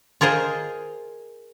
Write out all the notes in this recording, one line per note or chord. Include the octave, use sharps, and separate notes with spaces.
F4 G#4 A#4 C5 D#5